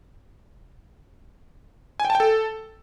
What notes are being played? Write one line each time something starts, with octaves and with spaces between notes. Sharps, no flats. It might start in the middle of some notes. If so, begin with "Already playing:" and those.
G#5
G5
A5
G5
A4